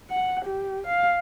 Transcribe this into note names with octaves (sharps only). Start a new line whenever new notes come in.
F#5
G4
F5